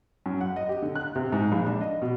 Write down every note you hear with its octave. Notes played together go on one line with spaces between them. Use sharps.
F#2
F#5
D#5
G4
D3
F#6
C3
G#2
A#1
D4
D#5
B2